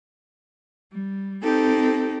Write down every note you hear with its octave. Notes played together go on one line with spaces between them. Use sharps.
G3
C4 D#4 G4 A4